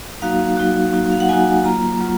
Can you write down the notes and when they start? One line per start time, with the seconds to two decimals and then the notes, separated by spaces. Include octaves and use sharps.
0.22 F#3 A#3 D#4 F#4 F5
0.57 F#3 A#3 D#4 F#4
0.93 F#3 A#3 D#4 F#4
1.12 F5
1.20 F#5
1.29 F#3 A#3 D#4 F#4 G#5
1.64 F#3 A#3 F4 A#5
2.00 F#3 A#3 F4